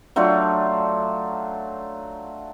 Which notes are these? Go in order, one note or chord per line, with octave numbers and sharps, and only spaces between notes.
F#3 A3 D4 F4